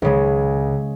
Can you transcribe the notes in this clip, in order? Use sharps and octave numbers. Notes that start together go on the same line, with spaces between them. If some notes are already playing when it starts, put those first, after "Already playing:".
C#2 C#3 G#3